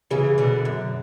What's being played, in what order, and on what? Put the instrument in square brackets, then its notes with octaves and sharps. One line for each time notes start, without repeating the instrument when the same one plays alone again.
[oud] C#3 E3 [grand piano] G#4
[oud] B2 D3
F#2